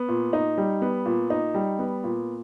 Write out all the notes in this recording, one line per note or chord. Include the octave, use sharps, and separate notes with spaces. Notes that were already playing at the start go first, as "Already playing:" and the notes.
Already playing: B3
A#2
D#4
G3
B3
A#2
D#4
G3
B3
A#2